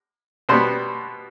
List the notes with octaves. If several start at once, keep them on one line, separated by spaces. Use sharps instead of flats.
B2 G3 B3 C5